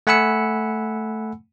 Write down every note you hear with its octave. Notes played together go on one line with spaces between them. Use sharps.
A3 F#5 G#5 B5 E6 C#7